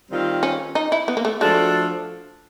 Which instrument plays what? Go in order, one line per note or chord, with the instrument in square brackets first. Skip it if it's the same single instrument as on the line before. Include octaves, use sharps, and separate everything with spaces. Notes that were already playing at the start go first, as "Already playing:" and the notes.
[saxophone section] D#3 G3 C4 F4
[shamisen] C#4
D#4
E4
B3
A#3
A3
[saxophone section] F3 A3 D4 F#4 A4 [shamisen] G#3